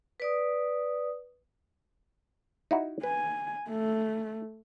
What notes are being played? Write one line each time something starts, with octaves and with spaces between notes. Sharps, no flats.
B4 D5 D#6
D#4 E4 F#4
B4 G#5
A3